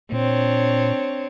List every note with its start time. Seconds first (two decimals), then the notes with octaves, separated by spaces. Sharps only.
0.12 A#2 C4 D4 C#5